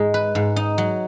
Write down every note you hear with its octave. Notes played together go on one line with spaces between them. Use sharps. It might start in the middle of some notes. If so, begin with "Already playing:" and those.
Already playing: G#2 G#3 D#4
B4
G#2
D#4
F#3